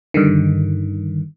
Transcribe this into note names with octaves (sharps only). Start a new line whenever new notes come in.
G2 D3 D#3